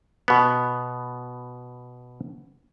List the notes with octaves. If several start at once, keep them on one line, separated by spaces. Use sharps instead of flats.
B2 B3